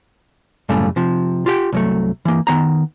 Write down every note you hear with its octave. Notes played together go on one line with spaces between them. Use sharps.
F#2 A2 C#3 G3 A3
C3 F3
F4 G4 G5
C2 F#3 A3
E3 A#3
D#3 B3 A#5